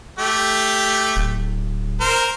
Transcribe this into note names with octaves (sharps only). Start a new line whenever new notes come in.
A3 G4
D1
A#4 C5